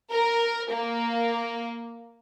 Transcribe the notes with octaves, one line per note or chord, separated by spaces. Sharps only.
A#4
A#3